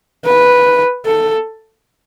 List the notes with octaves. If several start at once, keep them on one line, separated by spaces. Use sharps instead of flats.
B4
A4